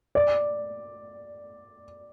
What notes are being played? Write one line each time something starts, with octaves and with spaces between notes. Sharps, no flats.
D5